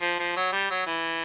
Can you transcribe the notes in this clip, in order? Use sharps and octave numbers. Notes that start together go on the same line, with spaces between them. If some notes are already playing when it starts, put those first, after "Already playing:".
F3
F3
F#3
G3
F#3
E3